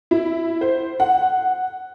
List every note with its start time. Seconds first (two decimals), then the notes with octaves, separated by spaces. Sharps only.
0.11 E4
0.61 C5
1.00 F#5